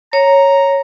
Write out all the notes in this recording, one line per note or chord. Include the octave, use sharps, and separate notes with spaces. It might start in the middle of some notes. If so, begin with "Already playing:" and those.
C#5 A#5